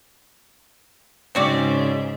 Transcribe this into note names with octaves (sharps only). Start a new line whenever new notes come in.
G#2 C#3 C4 F#4 D5